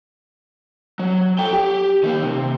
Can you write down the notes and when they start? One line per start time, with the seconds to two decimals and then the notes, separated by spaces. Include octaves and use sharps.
0.99 F#3
1.39 A4 G5
1.53 G4
2.03 D#3 A#3
2.23 C3